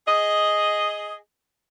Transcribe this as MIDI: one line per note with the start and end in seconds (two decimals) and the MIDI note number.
0.08 1.16 68
0.08 1.16 75